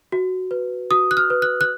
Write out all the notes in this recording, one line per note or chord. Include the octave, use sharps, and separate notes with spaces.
F#4
B4
F#4 D#6
F#6
F6
B4
F#6
F#6